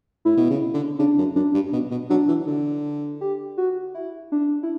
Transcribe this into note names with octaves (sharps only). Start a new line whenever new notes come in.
A2 E4
B2
C#3
D3
C#3 D4
F#2
F#2 D4
G2
B2
B2
F#3 D4
E3
D3
G4
F#4
E4
D4
E4